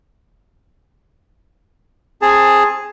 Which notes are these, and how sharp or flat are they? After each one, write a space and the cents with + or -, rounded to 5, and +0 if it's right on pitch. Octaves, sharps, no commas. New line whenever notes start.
C4 +20 G#4 +0 A5 +15